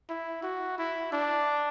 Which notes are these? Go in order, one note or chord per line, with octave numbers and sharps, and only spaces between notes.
E4
F#4
E4
D4